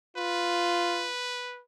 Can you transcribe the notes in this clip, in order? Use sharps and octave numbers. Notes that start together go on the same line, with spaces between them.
F4 B4